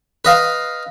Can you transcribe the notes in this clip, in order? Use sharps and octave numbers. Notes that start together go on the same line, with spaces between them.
B4 D#5 F5